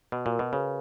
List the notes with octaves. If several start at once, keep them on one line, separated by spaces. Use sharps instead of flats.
B2 F#4
A#2
A#4
B2
C#3 B4